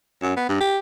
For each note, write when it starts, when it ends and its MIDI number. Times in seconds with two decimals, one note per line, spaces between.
0.22 0.37 42
0.37 0.48 59
0.49 0.60 43
0.60 0.78 67